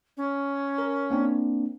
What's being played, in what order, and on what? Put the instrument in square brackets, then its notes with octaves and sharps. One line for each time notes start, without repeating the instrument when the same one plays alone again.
[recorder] C#4
[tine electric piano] A#4
A#3 C4 D4